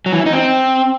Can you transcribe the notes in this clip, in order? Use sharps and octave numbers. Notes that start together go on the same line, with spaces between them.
F#3
E3
E4
D#4
C4